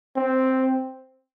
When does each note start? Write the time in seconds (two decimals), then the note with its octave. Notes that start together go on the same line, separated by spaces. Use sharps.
0.16 C4